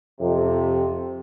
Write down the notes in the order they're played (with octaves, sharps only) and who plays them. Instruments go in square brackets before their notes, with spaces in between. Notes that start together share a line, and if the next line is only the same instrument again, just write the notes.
[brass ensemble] F2 C3